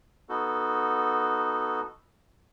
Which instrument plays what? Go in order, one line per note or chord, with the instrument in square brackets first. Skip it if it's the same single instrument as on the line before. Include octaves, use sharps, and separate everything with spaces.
[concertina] B3 D#4 F#4 A4